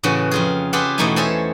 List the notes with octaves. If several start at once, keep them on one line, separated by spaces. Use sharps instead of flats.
A2 C#3 E3 C#4 F#4
F2 F4 G#4
F4 G4 G#4 B4 E5 F#5
E2 B2 A3 D#4 E4 G#5
C#4 A4 C5 C#5 E5